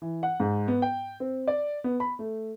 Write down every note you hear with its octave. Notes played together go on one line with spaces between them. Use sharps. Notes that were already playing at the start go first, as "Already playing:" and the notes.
E3
F#5
G#2
B3
G5
C4
D5
B3
B5
A3